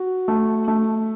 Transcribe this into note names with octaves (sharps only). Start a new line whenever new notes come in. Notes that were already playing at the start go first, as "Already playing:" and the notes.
Already playing: F#4
A3
A3